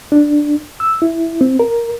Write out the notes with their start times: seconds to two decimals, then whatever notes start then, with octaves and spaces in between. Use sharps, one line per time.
0.12 D4
0.80 E6
1.02 E4
1.41 C4
1.60 A#4